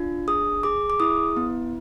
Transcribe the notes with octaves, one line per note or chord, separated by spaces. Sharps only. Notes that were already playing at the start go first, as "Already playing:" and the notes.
Already playing: D4 F4
G#4 D#6
G#4 D6
D6
E4 D#6
B3